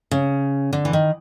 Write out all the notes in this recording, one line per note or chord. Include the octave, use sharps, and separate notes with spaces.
C#3
D3
E3
D#3